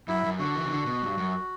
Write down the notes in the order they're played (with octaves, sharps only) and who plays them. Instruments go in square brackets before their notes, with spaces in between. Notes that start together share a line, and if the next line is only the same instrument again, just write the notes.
[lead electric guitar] F#2 [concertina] E4
[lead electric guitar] F#2
[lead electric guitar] D3 [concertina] F#4
[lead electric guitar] E3
C3
D3
B2
G2
F#2